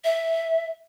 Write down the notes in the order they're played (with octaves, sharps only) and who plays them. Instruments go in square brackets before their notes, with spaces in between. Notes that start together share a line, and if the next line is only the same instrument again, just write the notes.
[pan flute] E5